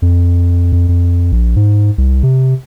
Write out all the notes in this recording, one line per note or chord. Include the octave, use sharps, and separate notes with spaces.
F2
F2
F2
A#1
G#2
C2
C3